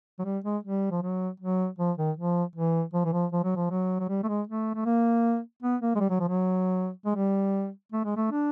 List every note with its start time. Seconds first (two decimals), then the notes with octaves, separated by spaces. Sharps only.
0.19 F#3
0.25 G3
0.44 G#3
0.64 G3
0.91 F3
1.02 F#3
1.40 F#3
1.79 F3
1.98 D#3
2.17 F3
2.56 E3
2.94 F3
3.05 E3
3.13 F3
3.32 F3
3.44 F#3
3.56 F3
3.70 F#3
4.00 F#3
4.09 G3
4.23 A3
4.28 G#3
4.47 A3
4.75 A3
4.85 A#3
5.63 B3
5.82 A#3
5.96 G#3
6.00 G3
6.10 F#3
6.20 F3
6.29 F#3
7.06 G#3
7.16 G3
7.92 A3
8.05 G#3
8.17 A3
8.31 D4